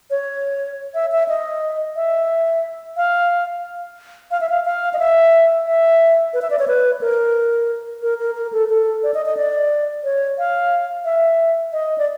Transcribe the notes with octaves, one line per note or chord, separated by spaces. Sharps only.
C#5
E5
E5
D#5
E5
F5
F5
E5
F5
F5
D#5
E5
E5
B4
E5
D5
C#5
B4
A#4
A#4
A#4
A#4
A4
A4
D5
D#5
D#5
D5
C#5
F5
E5
D#5
D5